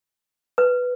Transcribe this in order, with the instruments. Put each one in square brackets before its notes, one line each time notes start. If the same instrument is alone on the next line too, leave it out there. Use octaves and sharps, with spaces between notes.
[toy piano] B4